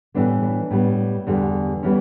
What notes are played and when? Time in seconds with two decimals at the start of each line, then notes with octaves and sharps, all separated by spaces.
0.14 A2 E3 G3 B3 D4
0.43 D4
0.71 A2 G3 B3
1.27 E2 D3 G3
1.83 E3 G3 B3 C#4